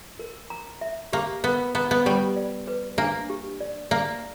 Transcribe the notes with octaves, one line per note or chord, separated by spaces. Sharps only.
A#4
A#5
E5
A#3 G4
B3 A#4
B3 A#5
B3
G3 G4
D5
B4
A#3 D4
G4
D5
A#3 D5